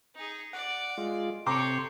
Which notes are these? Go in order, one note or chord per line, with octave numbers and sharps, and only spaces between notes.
D#4 G#4
D5 F#5
G#3 F4
C3 A4 C#5 G5 A#5 C6 D6